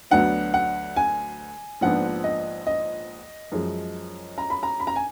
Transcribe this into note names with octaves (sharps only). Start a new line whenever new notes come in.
D2 D3 F#3 B3 D4 F#5
F#5
G#5
A#1 G#2 F3 B3 D4 F#5
D#5
D#5
F#2 F3 G#3
A#5
B5
A#5
B5
A#5
G#5